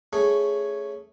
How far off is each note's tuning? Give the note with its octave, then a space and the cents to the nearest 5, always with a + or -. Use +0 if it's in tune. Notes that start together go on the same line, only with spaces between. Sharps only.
A3 +0 C#4 +0 G#4 +0